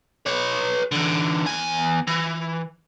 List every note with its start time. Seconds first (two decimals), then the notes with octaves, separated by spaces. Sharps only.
0.26 B4 C#5
0.92 D3 E3
1.47 E2 G#5
2.08 E3